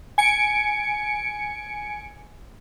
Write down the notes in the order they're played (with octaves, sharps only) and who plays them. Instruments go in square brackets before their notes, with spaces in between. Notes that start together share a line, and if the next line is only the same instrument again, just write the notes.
[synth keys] G#5 C#7 D7